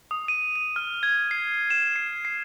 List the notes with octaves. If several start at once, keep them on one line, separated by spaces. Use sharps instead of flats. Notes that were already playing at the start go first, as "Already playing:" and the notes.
D#6
D#7
D#7
F6
G#6
C7
E7
C7
C7